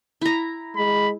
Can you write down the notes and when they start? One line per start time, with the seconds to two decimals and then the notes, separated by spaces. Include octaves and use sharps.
0.21 E4 A#5
0.76 G#3 B5